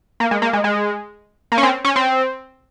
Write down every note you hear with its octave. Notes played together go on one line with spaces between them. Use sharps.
A#3
G#3
A#3
G#3
G#3
A#3
C#4
C4
C#4
C4